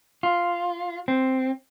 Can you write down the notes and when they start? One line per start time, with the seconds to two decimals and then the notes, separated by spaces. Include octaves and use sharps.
0.23 F4
1.08 C4